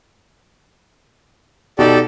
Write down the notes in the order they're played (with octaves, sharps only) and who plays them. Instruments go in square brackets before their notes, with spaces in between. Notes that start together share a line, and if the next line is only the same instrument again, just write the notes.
[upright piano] B2 D#4 [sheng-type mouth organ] G4 A4 D5